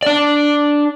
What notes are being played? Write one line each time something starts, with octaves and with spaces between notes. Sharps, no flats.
D4 D5